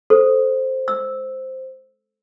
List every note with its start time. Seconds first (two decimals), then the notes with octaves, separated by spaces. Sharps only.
0.10 A4 C5
0.88 E6